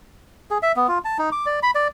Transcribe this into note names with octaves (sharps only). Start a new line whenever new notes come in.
G#4
E5
B3
F4
A5
D#4
D6
D5
B5
D5